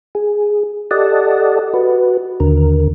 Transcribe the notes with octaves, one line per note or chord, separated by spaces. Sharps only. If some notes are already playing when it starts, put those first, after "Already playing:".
G#4
G4 A4 D5 D#5 F#5 A5
F#4 B4
D#2 D3 A#4